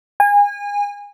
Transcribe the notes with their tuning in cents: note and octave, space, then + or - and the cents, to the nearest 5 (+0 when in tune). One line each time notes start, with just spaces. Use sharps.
G#5 -30